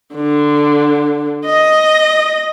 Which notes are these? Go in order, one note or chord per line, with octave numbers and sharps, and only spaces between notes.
D3
D#5